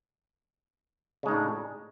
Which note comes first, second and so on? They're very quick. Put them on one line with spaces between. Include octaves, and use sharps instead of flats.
C#3 G#3 D#4 A2 D4